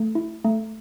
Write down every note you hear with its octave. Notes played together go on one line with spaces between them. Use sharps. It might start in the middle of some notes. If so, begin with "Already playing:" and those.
Already playing: A3
E4
A3